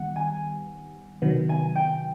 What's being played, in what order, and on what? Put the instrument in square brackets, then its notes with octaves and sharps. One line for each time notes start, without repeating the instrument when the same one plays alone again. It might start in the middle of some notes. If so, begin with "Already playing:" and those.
Already playing: [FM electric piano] D#3 G3 B3 [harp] F#5
[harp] G#5
[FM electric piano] C3 D#3 F#3 B3
[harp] G#5
G5